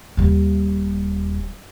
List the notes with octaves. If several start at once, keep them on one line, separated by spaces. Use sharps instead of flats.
D#1 G3